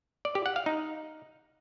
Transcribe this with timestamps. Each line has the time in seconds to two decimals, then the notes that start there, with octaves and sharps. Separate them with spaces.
0.25 D5
0.35 G4
0.46 F#5
0.56 F5
0.66 D#4